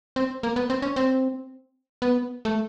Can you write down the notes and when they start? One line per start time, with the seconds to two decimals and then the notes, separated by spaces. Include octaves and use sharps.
0.16 C4
0.43 A#3
0.56 B3
0.70 C4
0.82 C#4
0.96 C4
2.02 B3
2.45 A3